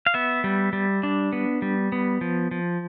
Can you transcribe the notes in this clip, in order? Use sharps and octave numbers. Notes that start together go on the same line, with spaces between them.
F5
B3 E5
G3
G3
D4
B3
G3
B3
F3
F3